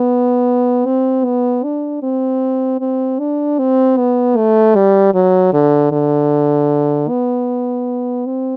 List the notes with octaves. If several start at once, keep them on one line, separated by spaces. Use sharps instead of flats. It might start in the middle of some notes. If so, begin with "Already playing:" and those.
Already playing: B3
C4
B3
D4
C4
C4
D4
C4
B3
A3
G3
F#3
D3
D3
B3
C4